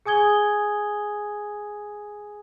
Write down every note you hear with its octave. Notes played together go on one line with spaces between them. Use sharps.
G#4 G#5 D#6 G#6 G7